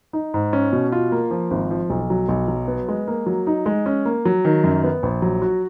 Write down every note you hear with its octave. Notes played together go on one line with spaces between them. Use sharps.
D#4
G#2
C#4
B2
F4
A#3
F3
G#1
F3
B1
F#3
B1
F#3
B3
G#3
A#3
F#3
D#4
G#3
C#4
A#3
F#3
D#3
F#2
B3
A#1
F#3
F#4